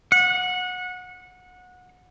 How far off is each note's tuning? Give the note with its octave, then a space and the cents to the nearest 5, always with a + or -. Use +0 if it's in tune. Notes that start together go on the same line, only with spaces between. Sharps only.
F#5 -20